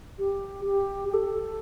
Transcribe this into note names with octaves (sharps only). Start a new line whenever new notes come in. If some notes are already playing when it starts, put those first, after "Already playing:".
G4
G4
G4
A4